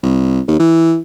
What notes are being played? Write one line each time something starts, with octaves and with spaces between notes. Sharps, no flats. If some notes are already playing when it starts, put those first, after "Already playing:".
C2
D#2
E3